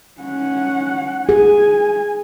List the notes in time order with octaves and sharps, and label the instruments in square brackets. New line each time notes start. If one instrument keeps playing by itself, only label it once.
[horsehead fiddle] C#4 F#5
[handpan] G#4 [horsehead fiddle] G#5